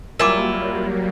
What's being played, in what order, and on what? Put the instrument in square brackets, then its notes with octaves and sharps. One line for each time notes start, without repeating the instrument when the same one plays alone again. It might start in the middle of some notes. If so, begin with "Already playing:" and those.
[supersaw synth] F#3 G3 A#3 [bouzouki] E4 F4 [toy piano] A#4 G#5 D6